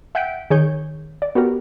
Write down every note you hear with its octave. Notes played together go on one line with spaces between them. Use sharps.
E5 F#5 G5 G6 B6 D7
D#3 G#4 C#5 G6
D5
B3 F#4 G4 A#4